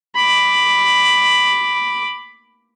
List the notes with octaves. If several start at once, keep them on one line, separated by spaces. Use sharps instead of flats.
B5 D6